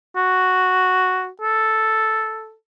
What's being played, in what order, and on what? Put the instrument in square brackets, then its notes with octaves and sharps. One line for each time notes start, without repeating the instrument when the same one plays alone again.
[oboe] F#4
A4